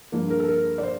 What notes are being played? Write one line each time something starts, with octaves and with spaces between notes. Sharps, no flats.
G2 F3 A#3 D4
A#4
A4
A#4
D5
C5